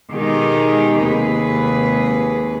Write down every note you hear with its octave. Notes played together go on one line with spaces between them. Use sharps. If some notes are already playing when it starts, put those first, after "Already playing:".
B2 D#3 G#3 D#4 G4 G#4
D#2 C3 G#3 G#4 B4